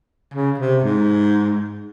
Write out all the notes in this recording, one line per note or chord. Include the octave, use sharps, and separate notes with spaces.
C#3
C3
G#2